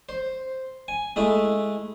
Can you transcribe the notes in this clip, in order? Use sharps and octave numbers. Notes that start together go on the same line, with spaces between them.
C5
G#5
G#3 A3 E4